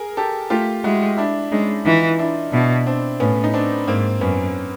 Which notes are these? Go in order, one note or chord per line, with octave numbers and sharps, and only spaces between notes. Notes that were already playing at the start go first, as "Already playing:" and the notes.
Already playing: G#4 A#4
G4 A4
A3 F4 G4
G#3 E4 F#4
D4 E4
G#3 C#4 D#4
E3 D#4 F4
D4 E4
B2 D4 E4
C4 D4
A2 B3 C#4
D#4
C4 D4
G#2 A#3 C4
F#2 B3 C#4